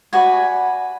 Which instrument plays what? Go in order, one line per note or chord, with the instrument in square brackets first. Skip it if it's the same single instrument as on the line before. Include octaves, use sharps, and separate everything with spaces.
[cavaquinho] F#4 B4 D5 G#5